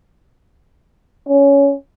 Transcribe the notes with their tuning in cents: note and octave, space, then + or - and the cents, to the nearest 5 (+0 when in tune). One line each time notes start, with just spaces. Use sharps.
C#4 +15